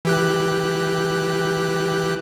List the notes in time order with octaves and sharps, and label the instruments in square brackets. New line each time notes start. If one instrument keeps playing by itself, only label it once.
[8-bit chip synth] E3 G4 F#6